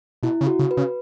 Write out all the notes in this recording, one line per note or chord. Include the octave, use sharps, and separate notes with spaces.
B2 E4
C#3
F#4
C#3
B4
C#3